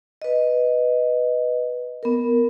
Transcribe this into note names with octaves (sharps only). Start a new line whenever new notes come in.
B4 D#5
B3 A#4